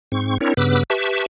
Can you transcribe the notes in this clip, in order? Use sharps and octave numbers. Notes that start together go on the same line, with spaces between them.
G#2 C4 C#6
C4 D4 E4 A#4 C#5
G2 C#3 B3 B4 D6 E6
G4 B4 E5 A5 C#6